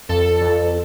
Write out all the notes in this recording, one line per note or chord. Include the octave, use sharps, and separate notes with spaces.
F2 A4
F2